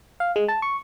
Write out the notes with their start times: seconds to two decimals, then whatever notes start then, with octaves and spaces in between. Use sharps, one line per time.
0.20 F5
0.36 G#3
0.48 A5
0.62 C#6